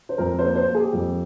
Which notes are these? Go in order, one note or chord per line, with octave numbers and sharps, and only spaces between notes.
C5
F2 A#4
C5
A#3 A#4
C5
A#3
G#4
G4
F2